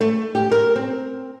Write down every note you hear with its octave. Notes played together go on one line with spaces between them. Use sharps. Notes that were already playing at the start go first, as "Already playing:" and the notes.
A3
G4
A#4
C4